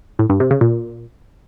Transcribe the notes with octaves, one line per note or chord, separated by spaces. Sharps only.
A2
G2
C3
C#3
A#2